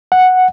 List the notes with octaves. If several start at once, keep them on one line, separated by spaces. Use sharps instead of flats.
F#5